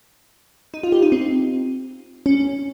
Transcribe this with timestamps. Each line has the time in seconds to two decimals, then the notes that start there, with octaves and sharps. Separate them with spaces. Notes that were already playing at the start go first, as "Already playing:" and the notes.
0.74 D#4
0.83 F4
0.92 G4
1.02 D#4
1.12 C4
2.26 C#4